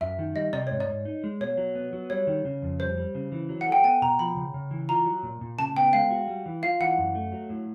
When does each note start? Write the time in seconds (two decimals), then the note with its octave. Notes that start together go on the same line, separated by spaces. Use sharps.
0.01 F#2 E5
0.19 D#3
0.35 G3 D#5
0.53 C3 D5
0.67 G#2 C#5
0.80 D5
0.88 G#2
1.05 D#4
1.24 G#3
1.40 B2 C#5
1.57 F#3
1.75 B3
1.93 F#3
2.10 G3 C#5
2.27 D#3
2.45 C#3
2.62 F2
2.79 G3 C5
2.97 G3
3.15 C#3
3.32 E3
3.49 F#3
3.61 F#5
3.67 A4
3.72 G5
3.84 B3 G#5
4.02 B2 A#5
4.19 F3 B5
4.36 C#3
4.54 C#3
4.71 E3
4.89 F4 A#5
5.06 F#3
5.23 A#2
5.41 A#2
5.58 C#3 A5
5.76 B3 G5
5.93 G#3 F5
6.11 F#4
6.28 G3
6.46 E3
6.63 F4 F5
6.80 E3 F#5
6.98 F#2
7.15 A3
7.32 F#3
7.50 A2